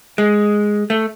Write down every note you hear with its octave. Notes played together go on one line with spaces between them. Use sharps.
G#3
A3